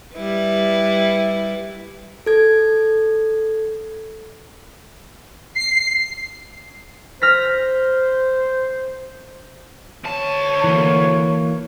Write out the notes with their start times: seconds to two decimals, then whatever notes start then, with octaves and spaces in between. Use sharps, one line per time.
0.16 G3 E4 B4
2.26 A4 G#6
5.55 C7
7.22 C5 F6 A#6 B6
10.04 D2 C#5 A5
10.64 E3 A#3